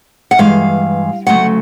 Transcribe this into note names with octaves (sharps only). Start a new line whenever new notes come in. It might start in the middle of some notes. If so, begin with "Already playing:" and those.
F#5
G2 E3 G#3 F5
D2 C#3 F#3 A3 F#5